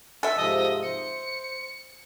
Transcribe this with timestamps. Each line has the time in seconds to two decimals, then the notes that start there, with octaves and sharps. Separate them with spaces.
0.23 A4 E5
0.37 G#2 C3 F3 D#5
0.83 C5 C#7